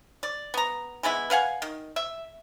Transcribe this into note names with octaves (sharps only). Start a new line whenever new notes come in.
D5
B3 A#5
E3 G#3 B3 E4
B4 F5 F#5 G#5
D#3
E5